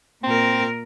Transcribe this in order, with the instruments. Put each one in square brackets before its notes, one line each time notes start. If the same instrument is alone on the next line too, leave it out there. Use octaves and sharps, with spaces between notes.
[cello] A#2 A#4 [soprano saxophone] C4